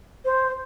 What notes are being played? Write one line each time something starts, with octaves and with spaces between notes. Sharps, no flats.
C5